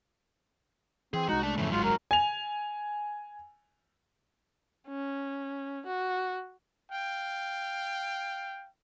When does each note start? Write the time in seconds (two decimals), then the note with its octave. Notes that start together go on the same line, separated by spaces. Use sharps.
1.14 E3 C4 G#4
1.29 C2 G#3 D#4 F#4
1.43 A3 D4 A5
1.58 F2 G#2 C#3 E3 F3 A3
1.72 D1 G#1 G#2 F#3 G#3 F4
1.84 A#4
2.11 G#5 F7
4.88 C#4
5.86 F#4
6.91 F5 G5